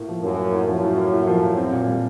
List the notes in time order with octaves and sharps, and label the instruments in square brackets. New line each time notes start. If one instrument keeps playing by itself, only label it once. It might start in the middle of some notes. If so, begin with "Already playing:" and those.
Already playing: [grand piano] A2 A#3
F3
[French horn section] F#2 [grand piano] A2
[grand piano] A#3
A2
[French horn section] F#2 [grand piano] F3
[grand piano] A2
A#3
A2
F3
A2
C4
A#2
G3